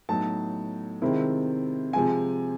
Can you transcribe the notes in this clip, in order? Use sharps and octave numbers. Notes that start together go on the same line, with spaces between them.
A2 F#3 B3 D#4 A5
C3 D#3 G#3 C4 E4
C3 F3 G#3 G#5